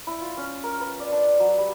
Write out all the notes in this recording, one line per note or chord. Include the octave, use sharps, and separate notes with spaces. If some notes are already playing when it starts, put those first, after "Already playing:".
E4
F4
C#4
A#4
B4
D5
D4
F#3
G3